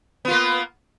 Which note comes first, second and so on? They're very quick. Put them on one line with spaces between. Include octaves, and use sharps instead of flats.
B3 F4 A#3